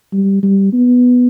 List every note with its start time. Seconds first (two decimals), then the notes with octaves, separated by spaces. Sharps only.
0.12 G3
0.43 G3
0.73 B3